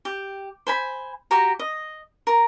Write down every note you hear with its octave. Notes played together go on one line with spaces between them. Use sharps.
G4
C5 G#5 B5
F#4 G4 A#5
D#5
A#4 A#5